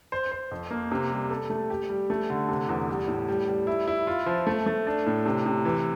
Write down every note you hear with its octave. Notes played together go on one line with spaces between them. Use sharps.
C5
C5
F2
A#3
C3
G3
A4
A3
G4
G3
A3
D3
C3
E2
G3
A2
G3
G3
E4
E4
F4
F3
A3
A3
D4
A2
C3
C3
E3